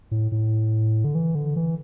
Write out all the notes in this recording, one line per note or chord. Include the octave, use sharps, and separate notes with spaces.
A2
A2
D3
E3
D3
E3